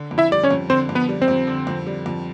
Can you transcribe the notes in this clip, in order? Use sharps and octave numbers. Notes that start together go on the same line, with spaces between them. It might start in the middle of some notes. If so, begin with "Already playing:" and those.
Already playing: D3
F2
E4 E5
G3 D5
C#4 C#5
F2
D3 C4 C5
F2
B3 B4
G3
C4 C5
F2
D3
F2
G3
F2